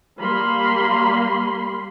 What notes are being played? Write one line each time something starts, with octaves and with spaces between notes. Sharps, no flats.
G3 A#3 B5 C6